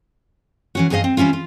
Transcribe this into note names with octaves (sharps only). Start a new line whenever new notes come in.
E3 C#4 F#4
E2 G2 G#4 C#5 D#5 F5
C4
E3 G3 C#4 E4 F4
F4